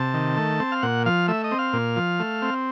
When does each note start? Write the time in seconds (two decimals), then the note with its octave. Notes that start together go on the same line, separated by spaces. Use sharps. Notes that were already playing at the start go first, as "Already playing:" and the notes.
Already playing: C3 A5
0.14 D#3
0.37 A3
0.60 C4
0.72 F5
0.82 A#2 F#5
1.06 F3 F5
1.28 A3 E5
1.44 D#5
1.52 C4
1.59 F5
1.73 A#2
1.96 F3
2.20 A3
2.42 C4